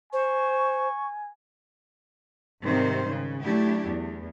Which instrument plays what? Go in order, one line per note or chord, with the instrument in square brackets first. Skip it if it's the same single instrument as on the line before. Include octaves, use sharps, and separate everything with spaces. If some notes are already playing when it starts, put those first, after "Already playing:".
[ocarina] C5 [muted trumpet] G#5 [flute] C#6
[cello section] G#2 C3 D#3 G3 C4 C5
C#3
F#3 A3 D4 E4 G4
E2